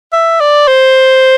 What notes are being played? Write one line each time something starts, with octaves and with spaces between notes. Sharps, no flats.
E5
D5
C5